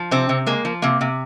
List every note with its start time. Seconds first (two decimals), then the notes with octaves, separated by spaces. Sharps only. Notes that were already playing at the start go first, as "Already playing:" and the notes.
Already playing: F3
0.11 C3 C4
0.29 C3
0.46 G#3 A#3
0.65 F3
0.82 C3 A#3
1.01 C3